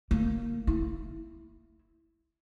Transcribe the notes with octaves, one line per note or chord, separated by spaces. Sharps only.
A#3
E4